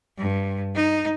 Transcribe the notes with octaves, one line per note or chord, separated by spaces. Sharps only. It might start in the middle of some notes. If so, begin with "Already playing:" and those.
G2
D#4